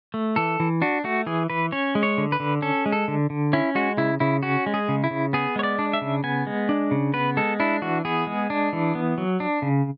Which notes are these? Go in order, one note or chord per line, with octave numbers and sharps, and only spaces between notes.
A3
E3 A4
E3
D4 F#4
A3 F#4
E3 G#4
E3 B4
C#4 C#5
G#3
C#5
D3
B4
D3
C#4 A4
G#3
A4
D3
D3
C#4 E4
G#3 F#4
C#3 E4
C#3 E4
C#4 F#4
G#3
G#4
C#3
E4
C#3
B3 G#4
G#3 C#5
D5
D4
E5
C#3
B3 G#5
G#3
D4
C#3
B3 B4
G#3 A4
D4 E4
E3 F#4
B3 G#4
G#3
D4
E3
B3
F#3
D4
C#3